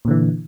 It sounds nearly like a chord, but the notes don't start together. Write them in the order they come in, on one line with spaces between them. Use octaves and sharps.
A#2 D3 E3